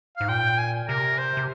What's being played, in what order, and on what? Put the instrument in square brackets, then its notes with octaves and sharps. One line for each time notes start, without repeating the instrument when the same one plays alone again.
[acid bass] G#2 [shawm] F5
[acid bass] A#2 [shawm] G5
[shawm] G#5
[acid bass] C3 [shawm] A#4
[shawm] C5
[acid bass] C3